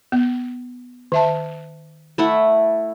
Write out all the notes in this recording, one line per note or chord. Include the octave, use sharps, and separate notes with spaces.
B3
D#3 E5 A5
A3 E4 F#5